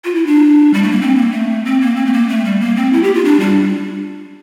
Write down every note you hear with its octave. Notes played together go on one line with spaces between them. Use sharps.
F4
E4
D4
G3
A3
A#3
C4
A#3
A3
C4
A#3
C4
A3
A#3
A3
G3
A#3
C4
E4
G4
F4
D4
G3